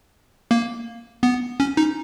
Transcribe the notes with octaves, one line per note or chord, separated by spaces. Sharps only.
A#3
B3
C#4
D#4